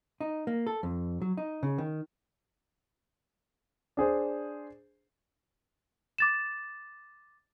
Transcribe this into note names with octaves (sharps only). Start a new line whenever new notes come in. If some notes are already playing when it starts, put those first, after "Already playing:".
D#4
A#3
A4
F2
F#3
D#4
C#3
D#3
D4 G#4 C5
D6 A6 E7